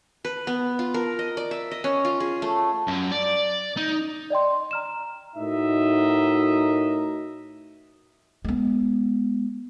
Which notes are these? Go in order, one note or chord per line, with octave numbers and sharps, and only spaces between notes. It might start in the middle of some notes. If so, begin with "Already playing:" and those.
B4
B3
F4
A#4
D#5
D5
E5
D#5
C#4
F4
G#4
A3
F#2
D5
D#4
D5 D#5 G5 C6
A#5 F6 E7
A2 D#4 F#4 A#4 D#5 E5
G#3 B3